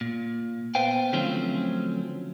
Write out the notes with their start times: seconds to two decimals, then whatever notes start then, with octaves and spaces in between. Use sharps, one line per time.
0.01 A#2
0.75 B3 B4 C5 F5 G5
1.13 D3 F3 F#3 A3 C4 C#4